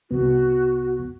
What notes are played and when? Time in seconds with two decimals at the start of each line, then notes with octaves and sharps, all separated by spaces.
0.11 C2 B3 F#4